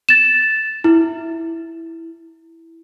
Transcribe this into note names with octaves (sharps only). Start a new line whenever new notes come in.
A6 E7
E4